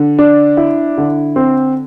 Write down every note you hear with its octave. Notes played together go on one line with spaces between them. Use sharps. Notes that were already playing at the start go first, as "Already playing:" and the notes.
Already playing: D3
D4
E4
D3
C4